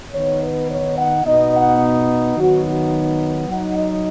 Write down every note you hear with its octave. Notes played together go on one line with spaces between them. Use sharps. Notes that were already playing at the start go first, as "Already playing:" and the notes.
D#3 B3 D#4 C#5
B4
C#5
F#5
B2 B3 D#4 D#5
F#5
D#3 F#3 B3 D#4 F#4
F#4
F#3 D#4 F#5
D#5